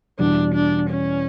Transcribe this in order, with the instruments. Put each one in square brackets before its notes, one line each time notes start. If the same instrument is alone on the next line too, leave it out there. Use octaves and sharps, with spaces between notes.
[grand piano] E2 B2 G3 [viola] D4
[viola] D4
C#4